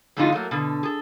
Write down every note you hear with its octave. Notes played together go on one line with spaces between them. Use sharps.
F2 A2 D3 G#3 D#4 F4
F#3 A3 A#3
B2 D3
G#4 A4